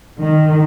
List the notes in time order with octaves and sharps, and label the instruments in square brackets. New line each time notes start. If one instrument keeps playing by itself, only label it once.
[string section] D#3